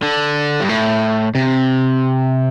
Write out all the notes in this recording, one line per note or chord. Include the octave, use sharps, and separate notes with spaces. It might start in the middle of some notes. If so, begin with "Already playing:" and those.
D3
G2
A2
C3